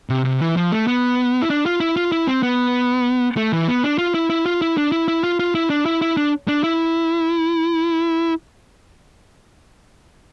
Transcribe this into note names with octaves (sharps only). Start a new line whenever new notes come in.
C3
C3
E3
F3
A3
B3
E4
D4
F4
E4
F4
E4
C4
B3
A3
E3
B3
D4
F4
E4
E4
F4
E4
D4
E4
E4
F4
F4
E4
D4
E4
E4
D4
D4
E4